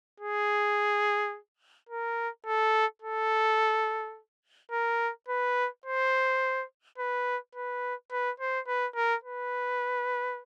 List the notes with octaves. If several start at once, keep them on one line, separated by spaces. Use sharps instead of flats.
G#4
A#4
A4
A4
A#4
B4
C5
B4
B4
B4
C5
B4
A#4
B4